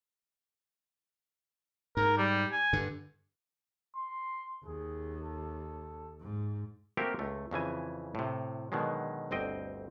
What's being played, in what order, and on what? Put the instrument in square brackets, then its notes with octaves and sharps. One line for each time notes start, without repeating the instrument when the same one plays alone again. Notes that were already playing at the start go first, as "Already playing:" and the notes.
[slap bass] G#2 [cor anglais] A#4
[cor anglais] G3
G#5
[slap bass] G2 D3
[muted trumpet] C6
[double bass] D#2 [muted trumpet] G#4
[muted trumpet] A4
[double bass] G#2
[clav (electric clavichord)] A3 A#3 C4 F#4 G4 A#4
C#2 A3
F2 C#3 E3 G#5
A2 C3
B2 D3 D#3 F#3 G#3
G1 D2 C4 D#5 G5